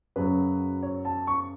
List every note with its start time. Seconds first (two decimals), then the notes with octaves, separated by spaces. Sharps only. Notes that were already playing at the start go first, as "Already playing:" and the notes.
0.16 F#2 C#3 F#3 B4
0.83 C#5
1.05 A5
1.27 C#6